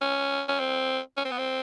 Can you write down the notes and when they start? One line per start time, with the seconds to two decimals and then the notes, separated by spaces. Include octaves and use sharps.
0.01 C#4
0.48 C#4
0.59 C4
1.17 C#4
1.25 C4
1.32 B3
1.38 C4